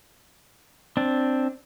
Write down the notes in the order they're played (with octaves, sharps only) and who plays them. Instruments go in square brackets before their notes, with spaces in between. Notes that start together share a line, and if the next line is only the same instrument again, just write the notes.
[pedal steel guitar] C4 D4